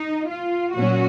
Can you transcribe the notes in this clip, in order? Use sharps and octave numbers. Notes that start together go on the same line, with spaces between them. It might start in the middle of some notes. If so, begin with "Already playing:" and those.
Already playing: D#4
F4
A#2 F#3 C#4 F#4